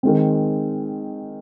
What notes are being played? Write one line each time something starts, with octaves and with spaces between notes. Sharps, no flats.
D#3 G#3 C4